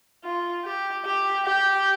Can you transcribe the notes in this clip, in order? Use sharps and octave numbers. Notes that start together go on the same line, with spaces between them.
F4
G4
G4
G4